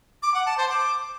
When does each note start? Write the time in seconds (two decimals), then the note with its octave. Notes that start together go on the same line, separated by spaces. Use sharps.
0.23 D6
0.34 F#5
0.46 A5
0.57 C5
0.69 D6